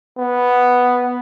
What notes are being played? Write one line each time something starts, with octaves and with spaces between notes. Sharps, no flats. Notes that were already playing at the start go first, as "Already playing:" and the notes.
B3